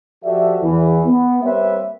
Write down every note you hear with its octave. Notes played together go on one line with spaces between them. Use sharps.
F3 F#4 G4 A4 D5 E5
E2 E3
B3
G3 A#3 C4 B4 C#5 E5